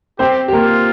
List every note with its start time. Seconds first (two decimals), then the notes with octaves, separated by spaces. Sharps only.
0.19 C4 G4 C5
0.48 G4
0.53 A#3 F4 A#4